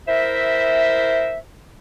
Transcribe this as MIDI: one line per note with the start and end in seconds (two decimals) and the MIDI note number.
0.08 1.37 64
0.08 1.37 70
0.08 1.37 72
0.08 1.37 76